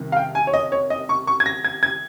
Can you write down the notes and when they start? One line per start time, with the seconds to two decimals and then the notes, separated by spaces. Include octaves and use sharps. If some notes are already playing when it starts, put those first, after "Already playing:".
Already playing: C2 C3 D#3
0.12 F5
0.16 G5
0.35 G#5
0.47 C#5
0.54 D#5
0.72 C#5
0.90 D#5
1.09 C#6
1.27 C#6
1.40 G#6
1.46 A#6
1.64 G#6
1.83 G#6